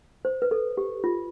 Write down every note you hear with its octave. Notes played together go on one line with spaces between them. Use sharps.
C5
B4
A4
G4
F4